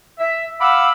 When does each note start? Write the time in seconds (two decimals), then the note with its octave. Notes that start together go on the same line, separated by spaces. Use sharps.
0.19 E5
0.61 F5 F#5 B5 D6 E6